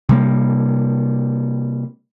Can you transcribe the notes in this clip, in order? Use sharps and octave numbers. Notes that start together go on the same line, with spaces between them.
C3 G3 A#3